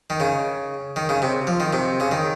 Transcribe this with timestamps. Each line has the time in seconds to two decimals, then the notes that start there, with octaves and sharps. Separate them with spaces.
0.10 D#3
0.20 C#3
0.96 D#3
1.09 C#3
1.22 C3
1.47 F3
1.60 D#3
1.73 C3
2.00 C#3
2.12 D#3